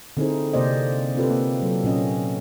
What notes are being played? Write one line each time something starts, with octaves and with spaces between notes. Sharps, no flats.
D3 C4 D#4 E4 G#4 C5
C3 A#3 C5 D5 D#5
C4 F4 G4 A4 B4
A#3
F#3 A4
A#2 C#4 D#5